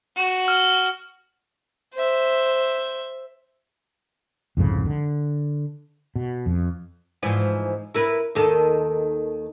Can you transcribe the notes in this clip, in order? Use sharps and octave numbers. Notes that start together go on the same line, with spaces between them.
F#4
F6
C5 E5
C2 F2 G#2 C#3
D3
B2
F2
G#2 E3 F3
E4 A#4 B4
D#2 D#3 A4